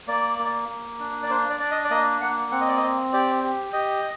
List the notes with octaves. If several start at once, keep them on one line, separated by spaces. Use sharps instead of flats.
A#3 D5
A#3
A#3
D4
D5
D4 C5
D5
D4 D5
D#5
D5
A#3 D#5
A#3 F#5
C4 F#5
D#5
D5
D#5
C4
G4 D5
G4
G4 D#5